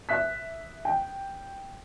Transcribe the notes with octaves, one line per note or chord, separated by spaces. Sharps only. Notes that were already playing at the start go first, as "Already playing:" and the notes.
E5 F#6 B6
G5